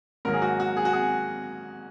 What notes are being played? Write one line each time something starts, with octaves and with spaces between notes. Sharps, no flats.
G#2 D#3 F#3 A#3 A#4
G#4
F#4
F#4
G#4
F#4
G#4